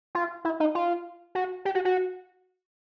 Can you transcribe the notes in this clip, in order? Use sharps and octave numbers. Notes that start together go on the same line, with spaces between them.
F4
E4
D#4
F4
F#4
G4
F#4
F#4